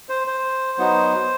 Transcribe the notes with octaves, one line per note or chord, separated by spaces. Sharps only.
C5
C5
F#3 B3 D#4